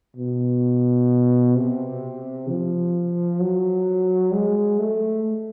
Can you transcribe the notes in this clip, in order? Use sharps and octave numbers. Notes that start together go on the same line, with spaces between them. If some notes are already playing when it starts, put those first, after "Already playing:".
B2
C3
F3
F#3
G#3
A3